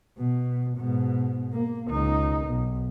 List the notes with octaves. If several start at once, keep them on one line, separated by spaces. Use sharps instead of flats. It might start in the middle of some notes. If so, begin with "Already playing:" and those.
B2
G#2 B2
A#3
C#2 D#4
B1